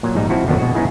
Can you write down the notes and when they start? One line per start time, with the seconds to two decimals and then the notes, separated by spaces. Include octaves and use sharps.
0.03 A#2 F#3
0.15 A#1 G#2 G3 D#4
0.29 F3 C4 E4 F#4 A5
0.46 A#1 F2 D3 D#3 F#3 B3
0.58 B2 G#3 F#4
0.74 G#3 B3 C#4 D#4 E4 G#4